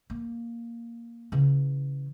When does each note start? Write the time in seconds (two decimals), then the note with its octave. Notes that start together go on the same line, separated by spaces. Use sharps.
0.10 A#3
1.32 C#3 E3